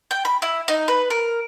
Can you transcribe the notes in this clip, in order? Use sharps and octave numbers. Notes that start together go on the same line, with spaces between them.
G5
B5
E4
D#4
B4
A#4